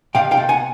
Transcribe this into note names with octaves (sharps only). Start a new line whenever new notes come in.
C3 F5 G5
F5 G5
C3
F#5 G#5